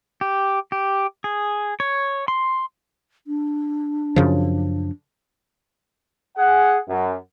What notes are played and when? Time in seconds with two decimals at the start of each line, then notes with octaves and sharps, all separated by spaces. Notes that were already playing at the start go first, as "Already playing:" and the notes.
0.21 G4
0.72 G4
1.24 G#4
1.80 C#5
2.28 C6
3.27 D4
4.16 F#2 C#3 F3
6.37 G#4 F#5
6.88 F#2